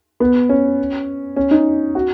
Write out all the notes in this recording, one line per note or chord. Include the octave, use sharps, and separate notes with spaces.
B3
C#4
C#4
D#4
F#4